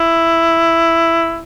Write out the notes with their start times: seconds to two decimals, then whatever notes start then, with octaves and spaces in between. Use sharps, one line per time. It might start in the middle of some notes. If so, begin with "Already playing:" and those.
Already playing: E4